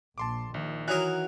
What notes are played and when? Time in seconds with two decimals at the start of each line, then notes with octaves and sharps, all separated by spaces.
0.18 A#1 A5 C6 D6
0.54 A#1 D#3
0.88 E3 F#3 A#4 D#6 F#6